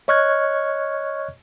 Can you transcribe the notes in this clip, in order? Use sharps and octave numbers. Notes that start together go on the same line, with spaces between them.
C#5 D#5 C#6 F6 F#6 G#6